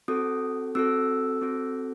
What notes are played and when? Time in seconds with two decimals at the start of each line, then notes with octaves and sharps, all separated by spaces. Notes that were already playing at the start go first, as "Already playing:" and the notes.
0.08 C4 F#4 A4 D#6
0.75 C4 F#4 A4 E6
1.42 C4 F#4 A4